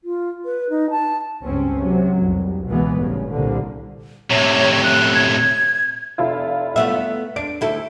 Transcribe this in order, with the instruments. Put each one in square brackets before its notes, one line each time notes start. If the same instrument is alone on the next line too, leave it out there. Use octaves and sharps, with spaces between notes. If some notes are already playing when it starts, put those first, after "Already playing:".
[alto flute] F4
B4
D#4
A5
[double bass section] C#2 G2 C4 C#4
C3 F#3
F1 C2
C#2 B2 E3 G#3 B3
G1 C2 A2 C#3
C2 A#2 D3 A#3
[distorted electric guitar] A2 C3 [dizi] C#5
[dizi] F#6
G#6
[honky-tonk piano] F1 E4 F4
[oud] A3 B3 E5
[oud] D4 [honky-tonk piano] D7
[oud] D2 E4 A4